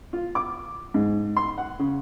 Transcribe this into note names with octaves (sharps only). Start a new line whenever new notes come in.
F4
D6
G#2
C6
F#5
C#3